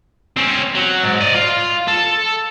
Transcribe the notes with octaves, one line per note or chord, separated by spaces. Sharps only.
C4 C#4
F#3
G#2
D5 D#5
F4
A4